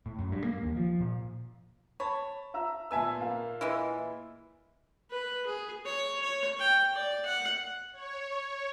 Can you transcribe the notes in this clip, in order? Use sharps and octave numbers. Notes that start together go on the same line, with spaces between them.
A2
F#2
G2
A#3
D#2
F3
A#2
C#5 A5 B5
E5 A#5 E6
A#2 B3 E5 G#5 A5 E6
A#3 F5
E3 G#3 E4
B4
G#4
C#5
C#5
G5
D5
F#5
C#5